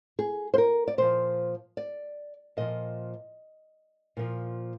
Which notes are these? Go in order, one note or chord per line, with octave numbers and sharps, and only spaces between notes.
G#4
C5
A#4
D5
A#2 F3 C5
D5
A#2 F3 D#5
A#2 F3